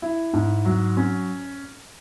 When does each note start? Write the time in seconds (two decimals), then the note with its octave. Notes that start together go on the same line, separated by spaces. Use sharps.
0.02 E4
0.33 G#2
0.65 F#3
0.97 C#4